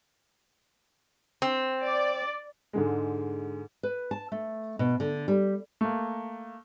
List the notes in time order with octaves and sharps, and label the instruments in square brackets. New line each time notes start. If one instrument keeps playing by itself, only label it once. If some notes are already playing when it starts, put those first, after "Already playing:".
[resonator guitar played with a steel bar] C4
[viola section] D5
[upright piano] G#2 D3 G#3
[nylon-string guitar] B4
A5
A3
B2
D3
G3
[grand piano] A3 A#3